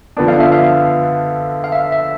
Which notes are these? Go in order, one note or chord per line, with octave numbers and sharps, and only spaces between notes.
D3 F3 B3 D4
F5
E5
F5
F5
E5
E5